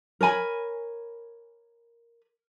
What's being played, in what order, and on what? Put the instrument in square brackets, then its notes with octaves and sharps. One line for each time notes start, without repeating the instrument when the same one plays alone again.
[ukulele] A#4 C#5 G#5 B5